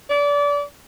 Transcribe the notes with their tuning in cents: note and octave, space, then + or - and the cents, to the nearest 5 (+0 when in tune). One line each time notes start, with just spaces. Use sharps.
D5 -30